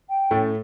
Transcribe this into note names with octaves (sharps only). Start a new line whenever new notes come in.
G5
A2 A3 C#4